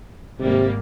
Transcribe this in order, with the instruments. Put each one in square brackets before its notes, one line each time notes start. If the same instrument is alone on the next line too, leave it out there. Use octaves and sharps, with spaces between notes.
[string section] G#1 G#2 G3 A#3 [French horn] C3